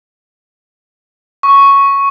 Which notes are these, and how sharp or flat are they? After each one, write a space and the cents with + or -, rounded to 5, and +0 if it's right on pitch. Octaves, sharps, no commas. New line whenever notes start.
C#6 +0